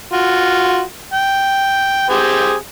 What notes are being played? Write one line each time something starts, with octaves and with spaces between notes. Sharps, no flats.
F4 F#4
G5
C4 G4 G#4